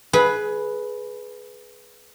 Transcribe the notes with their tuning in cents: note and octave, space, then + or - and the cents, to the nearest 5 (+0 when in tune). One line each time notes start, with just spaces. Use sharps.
G#4 +20 B4 -5